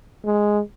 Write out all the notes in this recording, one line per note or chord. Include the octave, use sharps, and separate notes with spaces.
G#3